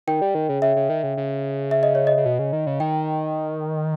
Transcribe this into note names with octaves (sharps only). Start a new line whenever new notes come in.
D#3 G5
G3
D#3
C#3
C#3 E5
C#3
D#3
C#3
C#3
E5
D#5
C#5
D#5
C#3
B2
C#3
D#3
C#3
D#3 G5